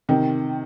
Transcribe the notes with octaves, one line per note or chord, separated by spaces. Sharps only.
C3 D#3